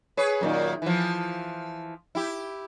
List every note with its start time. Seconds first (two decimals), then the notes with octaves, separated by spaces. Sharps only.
0.17 G#4 B4 C#5
0.41 F#2 A#2 D#3
0.82 E3 F3
2.15 E4 G4